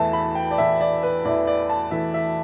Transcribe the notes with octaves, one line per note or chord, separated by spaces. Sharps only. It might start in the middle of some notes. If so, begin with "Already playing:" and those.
Already playing: E2 E3 A3 E4 A5
B5
G5
D5
E2 E3 A3 E4 E5
D5
B4
E2 E3 A3 E4 D5
D5
A5
E2 E3 A3 E4 E5
E5